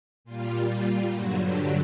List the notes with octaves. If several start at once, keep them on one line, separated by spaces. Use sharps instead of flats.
A#2 G3 F4
F4
G2 D3 F#3 F#4
G4